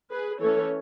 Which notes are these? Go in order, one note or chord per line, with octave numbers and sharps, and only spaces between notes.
G#4 B4
E3 A3 C#4 A4 C#5